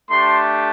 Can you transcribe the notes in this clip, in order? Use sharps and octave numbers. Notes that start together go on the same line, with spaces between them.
A3 D4 G4 C6